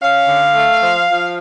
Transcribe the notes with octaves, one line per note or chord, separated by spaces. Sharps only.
C#4 F5
D3
A3
F3
F3